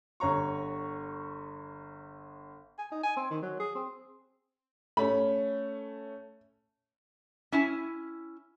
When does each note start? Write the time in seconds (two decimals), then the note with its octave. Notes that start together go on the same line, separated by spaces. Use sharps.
0.20 G1 C#5 A#5 C#6
2.78 G#5
2.91 D#4
3.04 G#5
3.17 C4
3.31 D#3
3.42 F#3
3.60 G#4
3.76 C4
4.97 A3 C#4 B5
7.52 C#4 E4 G#5